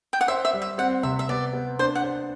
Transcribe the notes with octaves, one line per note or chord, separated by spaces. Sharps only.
G5
F#5
C5 E5
E5
G3
E5
C4 F#5
C3 E5
E5
B3 D5
B3
D4 C5
F#5
C5